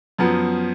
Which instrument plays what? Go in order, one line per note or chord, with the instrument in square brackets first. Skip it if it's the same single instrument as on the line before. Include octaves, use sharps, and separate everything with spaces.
[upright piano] F#2 F3 B3